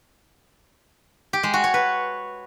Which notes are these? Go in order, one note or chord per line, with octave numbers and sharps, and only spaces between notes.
G4
G#3
F#4
C#5
B4